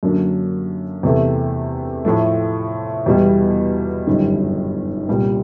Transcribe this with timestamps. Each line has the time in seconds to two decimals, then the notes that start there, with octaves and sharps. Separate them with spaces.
0.03 F#2 D3 F#3 A#3 D4
1.03 E2 C3 E3 A3
2.05 A2 F3 A3
3.06 E2 B2 G3
4.07 G1 F#2 D#3 G3
5.07 C2 A#2 G3 B3